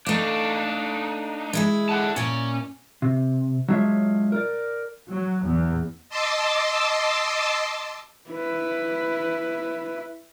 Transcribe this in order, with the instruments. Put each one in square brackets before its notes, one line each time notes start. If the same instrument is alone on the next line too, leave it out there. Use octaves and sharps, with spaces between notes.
[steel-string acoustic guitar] A3 F5 [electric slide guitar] D4 D#4
[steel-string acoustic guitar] G#3 E4 G#4
[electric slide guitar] A4 F#5 A5
[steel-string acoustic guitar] A#2 D5 [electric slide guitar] C#4
[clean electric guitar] C3
F#3 G#3 D4 F4 C#5 E5
A#4 D5
[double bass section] F#3
E2
[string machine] D#5 A5 C6 D6 E6
[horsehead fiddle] E4 B4